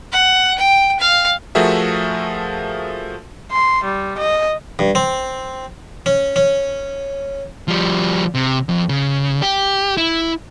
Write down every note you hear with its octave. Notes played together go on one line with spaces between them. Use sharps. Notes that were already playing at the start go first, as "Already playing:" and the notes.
F#5
G5
F5
F3 A3 F#4 G#4 A#4 E5
C6
G3
D#5
G2
C4
C#4
C#4
F3 G3
C3
F2
C#3
G4
E4